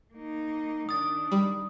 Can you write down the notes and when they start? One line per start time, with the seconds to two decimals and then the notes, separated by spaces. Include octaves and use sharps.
0.14 A#3 D#4
0.89 D#3 D4 D#6 A6
1.32 G3